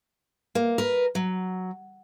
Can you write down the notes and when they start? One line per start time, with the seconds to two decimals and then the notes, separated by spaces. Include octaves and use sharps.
0.55 A#3
0.78 A#4 B4
1.15 F#3